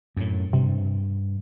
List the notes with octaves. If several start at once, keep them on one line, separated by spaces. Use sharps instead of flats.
F#2 A2
G2 C3